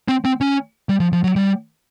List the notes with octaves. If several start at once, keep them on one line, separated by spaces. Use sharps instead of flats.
C4
C4
C#4
G3
F3
F3
F#3
G3